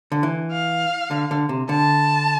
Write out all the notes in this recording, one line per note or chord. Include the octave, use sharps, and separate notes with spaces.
D3
E3
F5
D3
D3
C3
D3 A5